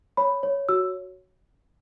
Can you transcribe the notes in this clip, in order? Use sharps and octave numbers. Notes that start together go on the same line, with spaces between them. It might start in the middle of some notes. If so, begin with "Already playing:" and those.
C#5 B5
C#5
F#4 E6